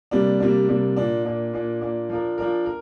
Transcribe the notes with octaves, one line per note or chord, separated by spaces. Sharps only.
C3 G3 A#3 D4
C3 G3 A#3 D4
C3 G3 A#3 D4
A#2 A#3 D4
A#2 A#3 D4
A#2 A#3 D4
A#2 A#3 D4
F3 D4 A#4
F3 D4 A#4
A#4